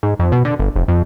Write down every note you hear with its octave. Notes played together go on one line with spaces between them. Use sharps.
G#2
F2
B2
D3
G1
F1
F2